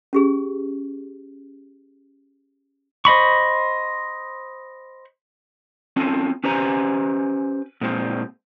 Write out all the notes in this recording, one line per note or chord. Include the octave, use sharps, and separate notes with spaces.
C#4 G4 G#4
C5 D#5 B5 C#6
C4 C#4 F4 A4
C#4 G4 B4 C5 G#5 A#5
A#2 G#3 C4